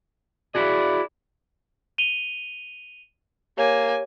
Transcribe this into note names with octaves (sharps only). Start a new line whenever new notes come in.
E4 F#4 G#4 D5
D#7 F7 G7
A#3 G4 C#5 G#5